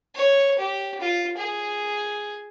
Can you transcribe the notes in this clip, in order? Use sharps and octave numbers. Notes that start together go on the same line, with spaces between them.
C#5
G4
F4
G#4